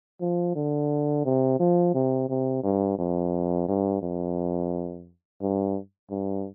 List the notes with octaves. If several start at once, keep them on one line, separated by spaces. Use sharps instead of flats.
F3
D3
C3
F3
C3
C3
G2
F2
G2
F2
G2
G2